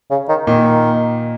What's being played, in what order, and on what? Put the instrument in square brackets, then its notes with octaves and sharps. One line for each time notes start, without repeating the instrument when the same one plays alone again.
[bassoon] C#3
D#3
[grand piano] A#2 [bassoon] D#3